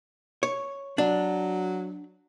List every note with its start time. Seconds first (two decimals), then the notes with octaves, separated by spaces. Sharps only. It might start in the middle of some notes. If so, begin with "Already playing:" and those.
0.43 C#5
0.98 F#3 D4